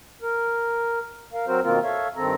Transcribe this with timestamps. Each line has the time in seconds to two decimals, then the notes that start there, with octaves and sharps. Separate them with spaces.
0.22 A#4
1.33 A#4 F5
1.47 F#3 C4 F#4 A#4 C5
1.63 B2 D#3 A#3 C4 F4 A#4
1.83 A4 C#5 E5 F5
2.16 G2 D#3 C4 A4 A#5